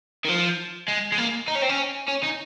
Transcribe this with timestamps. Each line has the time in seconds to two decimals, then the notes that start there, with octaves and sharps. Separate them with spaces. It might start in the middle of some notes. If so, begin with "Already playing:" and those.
0.25 D#3
0.29 F3
0.88 G#3
1.12 G#3
1.18 A#3
1.48 D#4
1.55 C#4
1.62 C4
1.69 C#4
2.08 C#4
2.23 D#4